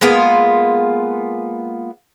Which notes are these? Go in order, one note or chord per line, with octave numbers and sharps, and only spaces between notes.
G#3 A#3 B3 F4